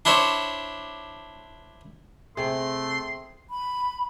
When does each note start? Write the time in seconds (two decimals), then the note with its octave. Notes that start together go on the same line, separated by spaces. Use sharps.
0.05 D4 E4 C5 C#5
2.37 C3 A3 C4 G#4 C6
3.50 B5